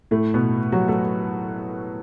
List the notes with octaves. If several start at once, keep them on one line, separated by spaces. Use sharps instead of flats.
A2 A3
B2 B3
F#3 F#4
A3 A4